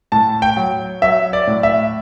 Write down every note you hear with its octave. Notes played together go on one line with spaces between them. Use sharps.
A2 A5
G5
F#3
F#3 E5
D5
A2
E5